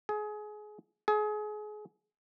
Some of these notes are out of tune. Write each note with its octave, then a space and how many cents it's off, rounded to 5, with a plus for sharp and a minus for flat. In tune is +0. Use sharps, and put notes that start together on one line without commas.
G#4 +25
G#4 +30